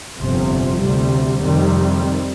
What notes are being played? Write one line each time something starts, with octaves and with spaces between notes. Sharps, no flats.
G1 F2 C3 F3
D2 C3 G3
F2 C3 D#3 G3 C4